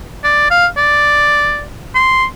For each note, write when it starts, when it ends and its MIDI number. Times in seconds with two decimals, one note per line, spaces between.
0.24 0.49 74
0.50 0.67 77
0.77 1.63 74
1.95 2.25 84